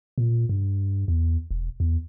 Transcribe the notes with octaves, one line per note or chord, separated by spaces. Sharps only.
A#2
G2
E2
E1
E2